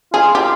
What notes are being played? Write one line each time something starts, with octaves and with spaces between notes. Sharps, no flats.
F4 G#4
F4 G4